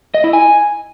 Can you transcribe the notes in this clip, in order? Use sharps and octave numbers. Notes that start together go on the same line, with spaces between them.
D#5
E4
G#5